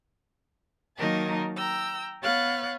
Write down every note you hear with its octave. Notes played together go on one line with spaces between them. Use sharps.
D#3 F#3 A#3 D#4 A#4 A5
G5 A#5 E6
B3 C#5 F5 F#6 A6